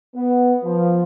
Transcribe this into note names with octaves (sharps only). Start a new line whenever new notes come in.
B3
F3